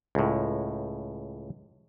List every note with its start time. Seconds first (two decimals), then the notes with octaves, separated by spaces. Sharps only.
0.15 C#2 A2